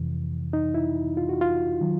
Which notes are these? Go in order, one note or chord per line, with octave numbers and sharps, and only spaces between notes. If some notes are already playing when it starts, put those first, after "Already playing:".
Already playing: F2 C3 E3
D#4
E4
F4
F#4
F4
D#3 F#3